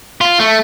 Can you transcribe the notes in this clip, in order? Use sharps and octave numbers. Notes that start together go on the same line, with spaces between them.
F4
A3